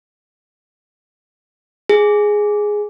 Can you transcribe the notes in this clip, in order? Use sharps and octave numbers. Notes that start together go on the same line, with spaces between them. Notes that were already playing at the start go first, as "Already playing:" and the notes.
G#4